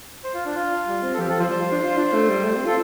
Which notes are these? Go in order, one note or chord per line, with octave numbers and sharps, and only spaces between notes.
C5
F4
D4
F4
G3
C4
A4
F3 G4
F3 A4
F3 C5
G3 C5
F4
D4
F4
D4
A3
G3
A3
C4
F4 A4